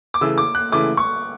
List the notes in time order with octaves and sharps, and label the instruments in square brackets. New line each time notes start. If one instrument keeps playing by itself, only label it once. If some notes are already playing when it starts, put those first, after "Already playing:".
[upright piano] D6
[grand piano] C#3 E3 A3 [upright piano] E6
[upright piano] D6
F#6
[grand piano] C#3 E3 A3 [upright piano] D6
[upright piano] C#6